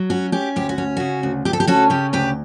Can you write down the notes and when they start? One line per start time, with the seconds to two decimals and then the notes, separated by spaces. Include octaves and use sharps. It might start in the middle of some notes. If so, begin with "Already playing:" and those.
Already playing: F#3
0.10 C#4 F#4
0.32 C#4 G4
0.56 D2 G4
0.69 F#4
0.78 C#4
0.97 C#3 F#4
1.23 D2
1.45 D2 G4
1.53 A4
1.60 G4
1.67 C#4 F#4 A4
1.90 C#3 G4
2.13 D2 G4 B4